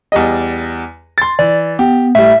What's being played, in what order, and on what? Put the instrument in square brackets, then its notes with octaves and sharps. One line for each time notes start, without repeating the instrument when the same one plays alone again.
[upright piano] E2 G3 D#5
C6 A6
[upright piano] E3 [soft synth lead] D5
[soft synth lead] B3 [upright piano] G4
[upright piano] A2 G3 [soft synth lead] E5